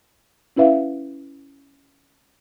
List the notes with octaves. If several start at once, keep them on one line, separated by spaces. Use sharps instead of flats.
C#4 E4 B4 E5 F5